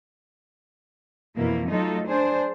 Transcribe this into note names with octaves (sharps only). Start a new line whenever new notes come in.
F2 B2 E3 A#3 E4
F#3 A3 D#4 F4 A4
D4 G#4 C5